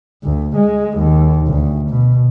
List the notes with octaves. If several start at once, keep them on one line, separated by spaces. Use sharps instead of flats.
D2
G#3
D#2
D2
B2